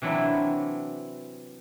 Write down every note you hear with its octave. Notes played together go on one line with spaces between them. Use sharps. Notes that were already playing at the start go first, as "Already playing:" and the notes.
C3 E3 F#3 D4 E4